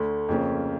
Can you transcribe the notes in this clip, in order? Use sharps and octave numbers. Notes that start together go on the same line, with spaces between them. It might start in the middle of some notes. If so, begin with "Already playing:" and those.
Already playing: D2 D3 A3
F2 C#3 F3 A#3 C#4